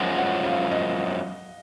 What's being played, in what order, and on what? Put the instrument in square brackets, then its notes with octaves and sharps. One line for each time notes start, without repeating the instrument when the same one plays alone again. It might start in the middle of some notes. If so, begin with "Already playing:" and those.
Already playing: [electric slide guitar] F#2 F3 G#3 [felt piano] F#5
[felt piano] F#5
F5
D#5